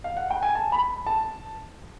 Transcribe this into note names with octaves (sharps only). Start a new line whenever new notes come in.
F5
F#5
G5
G#5
A5
B5
A5